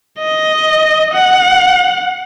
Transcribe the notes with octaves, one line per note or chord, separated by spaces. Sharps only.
D#5
F#5